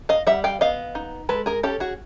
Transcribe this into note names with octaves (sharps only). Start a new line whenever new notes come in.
D#5 F5
G3 E5 F#5
F5 G5
B3 D#5 F5
D#4
G#3 A4 B4
G#4 A#4
C#4 G4 A4
F#4 G#4